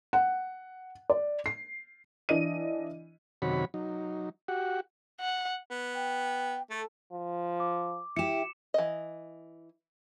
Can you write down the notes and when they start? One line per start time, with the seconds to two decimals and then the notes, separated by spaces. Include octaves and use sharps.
0.13 F#5
1.10 D5
1.46 C7
2.29 E3 D4 D#5 D#7
3.42 F#2 C3 D#3 F#4 C#5 B5
3.74 F#3 D#4
4.48 F#4 G4 F#5
5.20 F#5
5.71 B3
5.94 G5
6.70 A3 A4
7.13 F3
7.60 D6
8.16 E4 G4 C#7 E7
8.74 E3 D#5